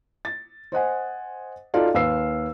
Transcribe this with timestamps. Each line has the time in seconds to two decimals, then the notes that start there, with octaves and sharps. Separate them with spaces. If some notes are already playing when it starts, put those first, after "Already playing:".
0.25 A6
0.72 C5 D#5 F#5 G#5
1.74 D#4 F4 F#4 A4 D5 F5
1.94 D#2 B4 F5 E6 C7